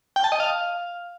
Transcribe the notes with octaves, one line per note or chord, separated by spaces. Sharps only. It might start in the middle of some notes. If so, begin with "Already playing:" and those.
G5
A5
D#5
F5